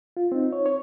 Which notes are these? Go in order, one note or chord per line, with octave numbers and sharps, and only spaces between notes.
F4
C4 D#4
C#5
C#5